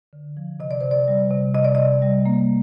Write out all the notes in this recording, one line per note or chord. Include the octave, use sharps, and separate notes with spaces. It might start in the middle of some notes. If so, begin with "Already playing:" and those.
D3
F3
C3 D#5
D5
C3 C5
D5
G3
C3
C3 D#5
D5
C3 D#5
G3
A#3